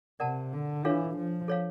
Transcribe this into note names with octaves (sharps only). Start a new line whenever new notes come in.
C3 A#4 D5 F#5 A5
D3
E3 D4 F4 A4 C#5 F5
F3
A4 C#5 F5